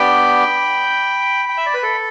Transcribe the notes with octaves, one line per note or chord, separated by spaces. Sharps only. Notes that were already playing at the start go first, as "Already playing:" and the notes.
Already playing: B3 D4 G4 G5 B5
G5
E5
D5
B4
A4